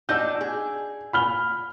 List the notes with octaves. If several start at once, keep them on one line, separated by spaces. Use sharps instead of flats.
D4 D#4 F#4 E6 G6
G#4
B5 F6 G7